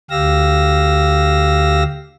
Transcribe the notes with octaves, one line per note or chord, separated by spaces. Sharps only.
D2 G4 F5 E6 A#6